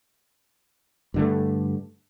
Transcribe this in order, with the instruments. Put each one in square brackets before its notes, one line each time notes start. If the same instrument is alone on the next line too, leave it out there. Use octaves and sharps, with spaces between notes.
[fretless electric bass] G2 D3 A3